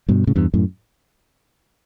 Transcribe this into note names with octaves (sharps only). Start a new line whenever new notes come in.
G2 B2
A2 C#3
E2 G2
F#2 A2